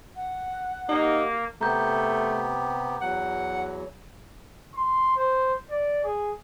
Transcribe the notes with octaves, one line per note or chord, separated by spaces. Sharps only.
F#5
A#3 D#4 G4
C3 A3 B3 G4 A#5 G6
E2 F#3 F#5
C6
C5
D5
G#4